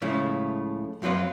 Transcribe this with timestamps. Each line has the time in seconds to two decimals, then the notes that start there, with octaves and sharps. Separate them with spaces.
0.02 C#2 A2 C#3 F3 A3
1.02 F#2 F3 F#3 C4 B4 F5